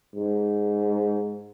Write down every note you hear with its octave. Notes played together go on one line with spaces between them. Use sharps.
G#2